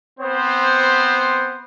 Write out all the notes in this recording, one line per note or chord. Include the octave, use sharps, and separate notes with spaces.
B3 C4 C5